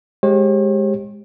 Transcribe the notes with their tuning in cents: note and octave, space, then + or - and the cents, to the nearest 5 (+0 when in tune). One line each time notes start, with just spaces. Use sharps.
G#3 +0 G4 +0 C#5 -45